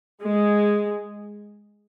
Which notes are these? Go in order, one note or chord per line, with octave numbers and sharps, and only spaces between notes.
G#3